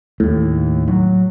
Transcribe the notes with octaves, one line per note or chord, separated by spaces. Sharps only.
D#2 A2 D#3
F#3